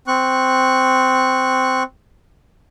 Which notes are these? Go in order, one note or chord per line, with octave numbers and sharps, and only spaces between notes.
C4 C#6 F#6